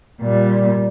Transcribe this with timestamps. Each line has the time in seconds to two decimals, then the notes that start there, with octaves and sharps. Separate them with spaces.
0.21 A#2 G3